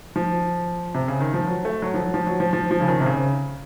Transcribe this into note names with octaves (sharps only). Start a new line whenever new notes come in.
F3
C3
C#3
D#3
F3
F#3
A3
F#3
F3
F#3
F3
F#3
F3
F3
F3
C#3
D#3
C3
C#3